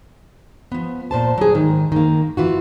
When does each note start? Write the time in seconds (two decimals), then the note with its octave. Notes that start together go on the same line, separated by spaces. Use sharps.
0.72 F3 B3
1.11 A#2 C5 A5
1.38 F#3 G#4
1.55 G#2 D#3
1.92 D#3 A#3
2.37 E3 F4 F#4